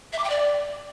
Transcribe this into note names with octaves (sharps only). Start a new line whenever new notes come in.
E5
D6
G5
D5